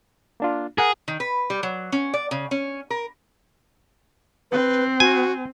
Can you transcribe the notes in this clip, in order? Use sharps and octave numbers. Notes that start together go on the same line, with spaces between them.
A#3 D4 F4
G#4 A#4 F#5
D#3
B4
G3
F#3
C#4
D5
C#3
C#4
A#4
C4 B4
F#4 G#5